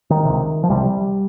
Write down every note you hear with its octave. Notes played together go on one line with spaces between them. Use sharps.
D#3
C#2 C3
F3
C2 C3 G3